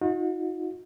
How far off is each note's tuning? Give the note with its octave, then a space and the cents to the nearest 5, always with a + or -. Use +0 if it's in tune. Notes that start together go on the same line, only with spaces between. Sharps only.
D#4 +30 F#4 -40